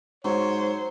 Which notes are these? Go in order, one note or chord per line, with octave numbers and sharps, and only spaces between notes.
G#2 F#3 C5 C#5